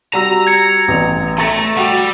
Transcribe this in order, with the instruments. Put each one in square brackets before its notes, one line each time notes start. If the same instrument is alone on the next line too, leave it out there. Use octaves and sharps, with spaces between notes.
[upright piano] G3 F#4 E6 [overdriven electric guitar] A#5
[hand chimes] G#6 C#7
[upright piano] A1 E2
[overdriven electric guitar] A3 [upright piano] A#5 A6 A#6
[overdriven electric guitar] G3 [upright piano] F#4 G5 E6